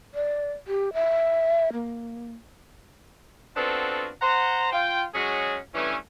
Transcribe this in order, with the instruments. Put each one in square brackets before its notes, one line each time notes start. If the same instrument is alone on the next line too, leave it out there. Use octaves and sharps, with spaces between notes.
[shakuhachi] D5
G4
E5
A#3
[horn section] B3 C4 D4 F4 F#4 A4
C5 F#5 A#5
F4 G5
F#3 G#3 C#4 F#4 G#4
G2 E3 A3 C#4